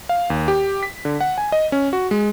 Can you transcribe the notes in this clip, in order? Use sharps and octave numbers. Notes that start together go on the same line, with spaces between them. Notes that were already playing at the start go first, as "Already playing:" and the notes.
F5
D#2
G4
B6
D3
F#5
G#5
D#5
C#4
F#4
G#3